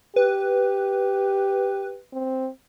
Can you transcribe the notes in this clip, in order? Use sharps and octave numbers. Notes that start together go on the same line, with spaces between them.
G4 B4
C4